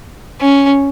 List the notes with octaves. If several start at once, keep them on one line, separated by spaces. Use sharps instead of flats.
C#4